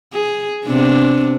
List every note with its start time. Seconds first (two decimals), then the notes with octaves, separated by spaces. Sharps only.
0.13 G#4
0.66 C3 B3 D4